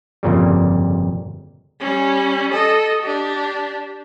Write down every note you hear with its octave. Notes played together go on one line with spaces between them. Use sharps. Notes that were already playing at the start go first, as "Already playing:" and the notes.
G1 F2 A#2 C#3 G3
G3 C#4
A4 D#5
D4 G4